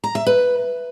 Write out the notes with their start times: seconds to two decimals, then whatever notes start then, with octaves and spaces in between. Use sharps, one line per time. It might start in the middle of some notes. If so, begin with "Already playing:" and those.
0.04 A#5
0.15 E5
0.27 B4